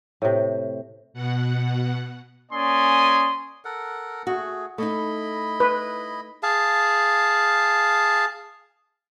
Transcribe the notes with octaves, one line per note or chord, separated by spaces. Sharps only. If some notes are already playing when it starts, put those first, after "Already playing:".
A2 C3
B2 F#5
A#3 C#4 D5 G#5 C6 D#6
A4 A#4 F#5
A3 F#4 G#4
A3 D#4 E4 D#5 B5
B4
G#4 F5 A5